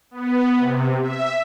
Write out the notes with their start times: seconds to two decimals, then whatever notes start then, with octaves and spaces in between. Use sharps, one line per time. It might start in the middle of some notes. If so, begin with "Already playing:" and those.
0.11 B3
0.57 C3
1.01 E5